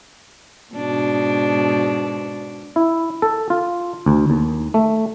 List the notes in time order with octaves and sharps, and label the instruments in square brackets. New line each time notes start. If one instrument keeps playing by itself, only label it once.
[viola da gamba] G#2 B2 D4
[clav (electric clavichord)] E4
A4
F4
D2
D#2
A3